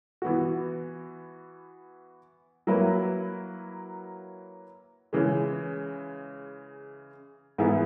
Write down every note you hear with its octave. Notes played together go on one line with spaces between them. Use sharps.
E3 B3 F#4
F#3 A#3 E4 B4
C#3 E3 G#3
G#2 E3 B3 E4 G#4